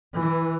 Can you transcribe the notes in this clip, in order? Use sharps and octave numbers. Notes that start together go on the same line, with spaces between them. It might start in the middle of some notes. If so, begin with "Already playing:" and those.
E3